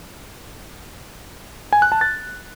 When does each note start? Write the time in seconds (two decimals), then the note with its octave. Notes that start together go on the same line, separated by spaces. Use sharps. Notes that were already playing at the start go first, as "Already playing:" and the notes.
1.73 G#5
1.82 F#6
1.92 A5
2.01 A6